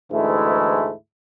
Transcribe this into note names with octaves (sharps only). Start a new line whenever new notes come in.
D2 G#2 E3 G#3 A3 E4